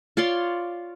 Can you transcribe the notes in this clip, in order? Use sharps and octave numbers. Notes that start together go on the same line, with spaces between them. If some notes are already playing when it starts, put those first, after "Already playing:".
F4 C#5 D5 C6